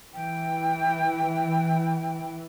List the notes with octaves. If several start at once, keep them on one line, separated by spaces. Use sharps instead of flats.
E3 G5